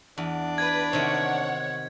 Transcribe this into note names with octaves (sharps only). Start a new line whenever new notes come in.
E2 D4
B4 G#6
C3 D#3 C#5 F#5